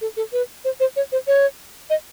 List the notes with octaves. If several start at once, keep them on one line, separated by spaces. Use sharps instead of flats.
A4
A4
B4
C5
C5
C#5
C5
C#5
D#5